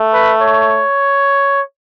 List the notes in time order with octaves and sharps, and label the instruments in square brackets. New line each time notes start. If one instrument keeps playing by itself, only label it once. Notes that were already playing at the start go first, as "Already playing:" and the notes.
Already playing: [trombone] A3
[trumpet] B4
C#5